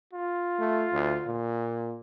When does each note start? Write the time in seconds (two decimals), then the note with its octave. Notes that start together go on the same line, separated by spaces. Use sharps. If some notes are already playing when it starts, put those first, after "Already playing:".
0.13 F4
0.59 A3
0.93 D2
1.26 A#2